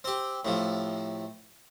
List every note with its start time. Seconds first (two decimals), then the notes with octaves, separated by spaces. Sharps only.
0.04 C4 G4
0.45 A2 C3 F3